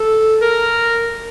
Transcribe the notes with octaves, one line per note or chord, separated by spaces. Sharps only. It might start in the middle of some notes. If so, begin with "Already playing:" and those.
Already playing: A4
A#4